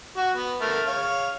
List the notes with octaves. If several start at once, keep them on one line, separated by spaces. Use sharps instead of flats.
F#4
B3
A3 A#4
C#5 F5